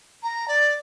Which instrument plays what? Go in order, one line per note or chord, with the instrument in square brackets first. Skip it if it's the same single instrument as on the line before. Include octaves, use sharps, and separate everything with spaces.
[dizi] A#5
D5